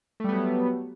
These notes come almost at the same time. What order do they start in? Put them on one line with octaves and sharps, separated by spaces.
A3 G3 B3 F#3